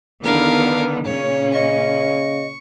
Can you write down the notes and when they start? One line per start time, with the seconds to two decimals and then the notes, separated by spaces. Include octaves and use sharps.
0.24 E2 D3 D#3 B3 A#4 F5
1.05 A#2 C#3 C#4 C#5
1.54 D#5 C#6